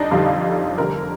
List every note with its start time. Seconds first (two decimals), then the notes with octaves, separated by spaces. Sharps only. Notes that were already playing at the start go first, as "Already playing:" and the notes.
Already playing: F2 D3 G3 D4 D#4
0.11 F2 D3 G3 F4
0.78 F1 F2 D3 G3 A#4